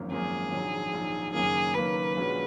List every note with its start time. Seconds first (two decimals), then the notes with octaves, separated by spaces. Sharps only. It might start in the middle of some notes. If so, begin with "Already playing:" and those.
Already playing: G#1 F#2 F3 A#3
0.11 G#1 F#2 F3 A#3 G#4
0.52 A#1 G#2 D#3 F#3
0.93 A#1 G#2 D#3 F#3
1.34 F#1 F#2 D#3 A#3 G#4
1.74 F#1 F#2 D#3 A#3 B4
2.15 A#1 A#2 G#3 C#4 F#4